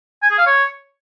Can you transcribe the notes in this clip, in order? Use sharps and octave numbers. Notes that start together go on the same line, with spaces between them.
G#5
G#4
F5
C#5